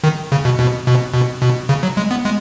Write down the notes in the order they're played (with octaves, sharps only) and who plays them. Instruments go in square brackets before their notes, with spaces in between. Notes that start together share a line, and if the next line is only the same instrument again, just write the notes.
[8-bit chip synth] D#3
C#3
B2
B2
B2
B2
B2
C#3
F#3
G#3
B3
G#3